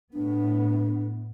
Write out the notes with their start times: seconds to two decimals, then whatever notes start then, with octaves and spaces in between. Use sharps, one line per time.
0.14 A2 B3 D4